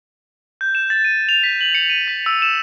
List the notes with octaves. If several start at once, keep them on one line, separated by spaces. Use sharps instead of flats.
G6
E7
A6
D#7
F7
B6
F#7
C#7
D#7
B6
E6
E7